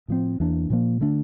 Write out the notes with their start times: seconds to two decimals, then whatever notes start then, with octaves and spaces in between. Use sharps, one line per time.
0.08 A2 F3 C4
0.40 E2 E3 A#3 D4
0.70 A#2 F3 A#3
1.01 D3 A3 D4